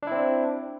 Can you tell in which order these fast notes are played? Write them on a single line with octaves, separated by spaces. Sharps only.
D4 E4 C4